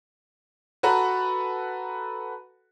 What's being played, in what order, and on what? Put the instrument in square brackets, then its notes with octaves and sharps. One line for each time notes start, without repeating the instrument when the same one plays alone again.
[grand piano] F#4 A4 B4 F#5 A#5